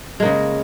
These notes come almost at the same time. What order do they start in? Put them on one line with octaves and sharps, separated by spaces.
G#3 A#3 C#3